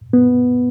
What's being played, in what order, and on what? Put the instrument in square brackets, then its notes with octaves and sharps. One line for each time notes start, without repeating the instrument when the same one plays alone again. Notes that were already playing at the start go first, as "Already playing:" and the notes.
[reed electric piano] B3